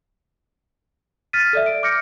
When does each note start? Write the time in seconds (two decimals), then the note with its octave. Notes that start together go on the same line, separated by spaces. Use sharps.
1.33 F6 A6 B6 D#7
1.53 A4 D5 E5
1.66 D7
1.83 D6 F6 G6 A#6 C#7